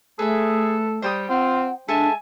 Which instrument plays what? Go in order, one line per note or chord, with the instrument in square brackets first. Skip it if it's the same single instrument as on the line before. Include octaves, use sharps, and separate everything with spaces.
[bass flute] A3 [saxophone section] G#4 [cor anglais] A4 [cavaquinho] B4 E5
[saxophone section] G3 [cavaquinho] C5 G5 D#6
[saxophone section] C4 [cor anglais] F4 [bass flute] F#5
[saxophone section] G#3 E5 [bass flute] D4 [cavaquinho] A4 A5 [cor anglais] G#5